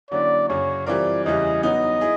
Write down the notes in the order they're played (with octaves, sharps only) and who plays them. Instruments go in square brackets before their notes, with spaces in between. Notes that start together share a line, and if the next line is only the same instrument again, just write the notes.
[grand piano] D3 F#3 A#3 C#4 E4 [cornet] D5
[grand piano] F#2 C#3 F#3 [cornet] C#5
[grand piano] E3 G3 C4 F4 A#4 [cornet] D5
[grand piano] E2 C#3 E3 G3 [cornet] D#5
[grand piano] F#3 B3 D#4 [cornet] D#5
[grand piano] E4 G#4